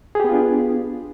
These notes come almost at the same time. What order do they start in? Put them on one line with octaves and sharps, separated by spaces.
G#4 G4 B3 F4 D4